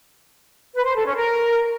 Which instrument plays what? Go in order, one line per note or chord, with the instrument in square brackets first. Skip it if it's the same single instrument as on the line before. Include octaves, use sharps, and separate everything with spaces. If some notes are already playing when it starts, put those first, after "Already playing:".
[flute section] B4
C5
A4
C#4
A#4